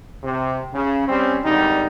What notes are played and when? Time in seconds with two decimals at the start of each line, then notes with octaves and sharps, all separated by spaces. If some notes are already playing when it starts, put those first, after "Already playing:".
0.24 C3
0.73 C#3
1.07 G3 C4 C#4
1.44 G#1 D3 G3 D#4